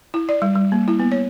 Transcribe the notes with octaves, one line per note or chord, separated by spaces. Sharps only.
E4
D5
G3
G3
A#3
E4
B3
C#5